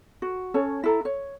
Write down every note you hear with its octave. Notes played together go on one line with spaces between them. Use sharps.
F#4
C#4 A4 C#5 A5
E4 A4 A#5
C#5